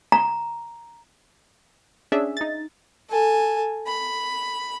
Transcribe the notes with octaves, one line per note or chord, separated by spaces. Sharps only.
A#5
C#4 D4 G#4 E5
D#4 A6
A4 G#5
B5